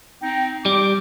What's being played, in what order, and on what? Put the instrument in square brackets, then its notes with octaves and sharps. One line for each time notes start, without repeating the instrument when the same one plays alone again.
[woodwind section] C4 D#4 G5
[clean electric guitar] G3 [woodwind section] D6